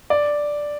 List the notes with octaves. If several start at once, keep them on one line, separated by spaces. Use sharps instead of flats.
D5